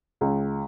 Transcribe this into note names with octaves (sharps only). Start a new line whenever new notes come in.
C#2